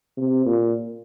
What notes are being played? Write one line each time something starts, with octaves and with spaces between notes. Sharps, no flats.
C3
A#2